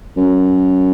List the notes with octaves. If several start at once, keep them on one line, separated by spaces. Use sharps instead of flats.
F#2